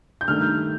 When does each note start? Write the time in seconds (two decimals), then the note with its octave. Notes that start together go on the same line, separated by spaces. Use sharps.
0.21 G6
0.28 G2 D#3 A3 D#4 F6